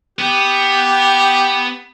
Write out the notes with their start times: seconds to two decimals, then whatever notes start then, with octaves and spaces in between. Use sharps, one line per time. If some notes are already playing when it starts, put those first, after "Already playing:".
0.19 B3 G4